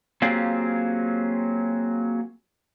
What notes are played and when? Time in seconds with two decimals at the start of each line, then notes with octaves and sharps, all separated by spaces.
0.22 F#3 A#3 C4 F4 G4 G#4